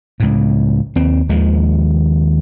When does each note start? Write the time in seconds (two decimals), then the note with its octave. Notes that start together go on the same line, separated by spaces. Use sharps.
0.20 C#2 A2
0.96 D#2 C4
1.29 D#2 D#3 F3 G#3